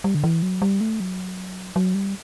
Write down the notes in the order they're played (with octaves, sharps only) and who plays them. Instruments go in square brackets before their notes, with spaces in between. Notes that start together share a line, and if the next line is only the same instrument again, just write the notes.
[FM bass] G3
D3
E3
F#3
G3
A3
F#3
F#3
G3